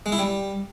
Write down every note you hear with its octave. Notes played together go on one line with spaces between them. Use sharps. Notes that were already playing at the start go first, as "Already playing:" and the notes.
G#3
E4
G3